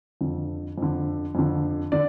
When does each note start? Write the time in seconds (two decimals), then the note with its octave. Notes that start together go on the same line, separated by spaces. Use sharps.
0.21 F2 D3
0.78 F2 D3
1.35 F2 D3
1.92 D3 D5